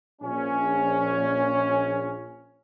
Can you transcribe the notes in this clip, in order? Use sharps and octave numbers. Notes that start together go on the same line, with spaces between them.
A#1 C#4